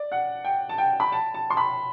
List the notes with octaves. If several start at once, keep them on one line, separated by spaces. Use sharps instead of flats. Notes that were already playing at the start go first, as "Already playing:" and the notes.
Already playing: D5
F#5
G5
A5
G5
B5
A5
A5
C6
B5